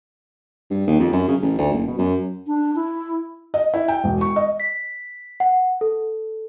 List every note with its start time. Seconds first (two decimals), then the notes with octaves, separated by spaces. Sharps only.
0.70 G2
0.87 D#2
1.00 F2
1.12 F#2
1.28 C#3
1.42 A1
1.58 D2
1.72 F#1
1.87 B2
1.98 F#2
2.47 D4
2.75 E4
3.54 D#5
3.74 E4
3.88 G5
4.04 E1
4.21 C#6
4.36 D#5
4.60 B6
5.40 F#5
5.81 A4